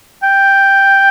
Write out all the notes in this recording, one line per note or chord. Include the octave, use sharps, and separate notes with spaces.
G5